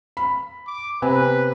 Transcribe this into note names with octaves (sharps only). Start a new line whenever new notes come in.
B5
D6
C3 B3 B4 G#5